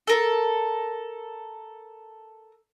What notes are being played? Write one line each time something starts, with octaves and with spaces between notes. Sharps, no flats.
A4 A#4